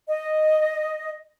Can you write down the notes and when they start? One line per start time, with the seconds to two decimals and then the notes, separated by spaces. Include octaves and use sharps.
0.08 D#5